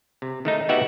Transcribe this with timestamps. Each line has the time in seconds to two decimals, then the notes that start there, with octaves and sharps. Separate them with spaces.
0.22 C3
0.45 D#3 A3 D#4
0.69 B3 D#4 F#4 G4 E5 F#5